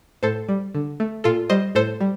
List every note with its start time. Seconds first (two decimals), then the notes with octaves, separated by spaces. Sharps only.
0.23 A2 A4 C5
0.49 G3
0.74 D3
1.00 A3
1.24 A#2 F4 A4
1.50 G3 C5 D#5
1.75 A2 A4 C5
2.01 G3